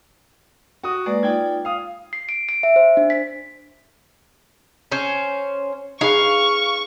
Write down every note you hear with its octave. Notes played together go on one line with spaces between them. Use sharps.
F#4 D#6
G#3 A#3 B4 D5
D#4 F4 D5 G5 G#6
F5 D#6
C7
D7
D7
E5
C5
D4
B6
C#4 C5
D#4 G#4 B4 F5 C#6